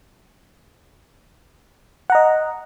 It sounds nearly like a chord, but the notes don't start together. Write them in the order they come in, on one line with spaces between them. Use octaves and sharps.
F#5 A#5 D#5